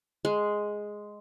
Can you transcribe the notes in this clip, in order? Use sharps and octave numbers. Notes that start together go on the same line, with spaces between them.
G#3